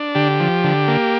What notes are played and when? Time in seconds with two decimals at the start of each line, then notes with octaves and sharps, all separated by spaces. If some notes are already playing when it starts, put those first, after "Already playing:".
Already playing: D4
0.15 D3 G4
0.40 F3
0.64 D3
0.88 A#3